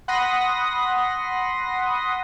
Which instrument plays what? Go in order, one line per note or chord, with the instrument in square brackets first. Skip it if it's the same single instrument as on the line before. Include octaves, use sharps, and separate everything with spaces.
[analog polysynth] F#5 B5 C6 D#6 A#6